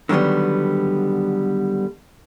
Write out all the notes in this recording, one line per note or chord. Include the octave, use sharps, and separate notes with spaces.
D3 D#3 F#3 G3 B3